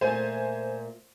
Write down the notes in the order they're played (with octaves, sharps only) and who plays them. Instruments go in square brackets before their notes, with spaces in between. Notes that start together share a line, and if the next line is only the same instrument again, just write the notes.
[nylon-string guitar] A#2 A3 [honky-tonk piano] C5 G#5